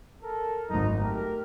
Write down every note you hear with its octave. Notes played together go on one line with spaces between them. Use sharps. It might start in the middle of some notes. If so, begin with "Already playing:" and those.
A4 A#4
G#1 F#2 D#4 A#5
A3 G4 A#4